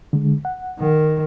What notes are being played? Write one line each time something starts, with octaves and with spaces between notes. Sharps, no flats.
D3 G#3
F#5
D#3